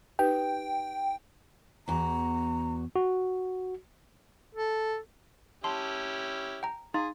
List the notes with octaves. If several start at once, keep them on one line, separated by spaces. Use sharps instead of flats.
D#4 G4 B4 G5
E2 F#4 A#5
F#4
A4
C#4 E4 G4 A5 C6
G5 A#5
D#4 G#4 F5 C6 A6